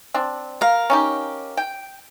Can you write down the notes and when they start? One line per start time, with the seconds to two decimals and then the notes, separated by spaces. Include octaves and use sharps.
0.14 C4 D4
0.61 A#4 F5
0.90 C#4 D#4 G4
1.57 G5